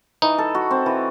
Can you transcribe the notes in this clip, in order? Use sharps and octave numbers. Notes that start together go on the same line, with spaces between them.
E3 D#4
A4
F#4
C4
E3